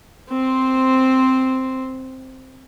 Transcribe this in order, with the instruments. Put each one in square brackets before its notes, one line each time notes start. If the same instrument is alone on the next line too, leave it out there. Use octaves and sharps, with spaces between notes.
[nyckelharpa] C4 C5